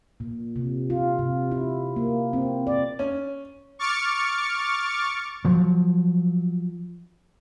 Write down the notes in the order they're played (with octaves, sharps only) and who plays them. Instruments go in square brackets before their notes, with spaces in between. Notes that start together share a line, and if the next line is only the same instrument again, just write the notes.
[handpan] A#2
C3
F4
C3
E4
A#3
C4
D5
[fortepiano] C#4
[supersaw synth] C#6 D6 F6 A6 C#7
[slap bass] F3 F#3